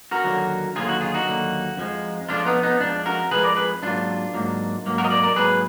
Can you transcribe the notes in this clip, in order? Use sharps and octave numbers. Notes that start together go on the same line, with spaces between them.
F#4 A#4
D#2 D3 F#3 A#3
D#2 D3 F#3 A#3 F4 G#4
D#4 F#4
F4 G#4
D#4 F#4
D#2 D3 F#3 A#3
F2 F3 G#3
F2 F3 G#3 D4 F4
B3 D#4
B3 D#4
F2 F3 G#3 D4
F#4 A#4
F2 F3 G#3 G#4 B4
A#4 D5
G#4 B4
G#2 F#3 A#3 D4 F4
G#2 F#3 A#3
G#2 F#3 A#3
F#4 A#4
D#5
A#4 D5
A#4 D5
G#2 F#3 A#3 G#4 B4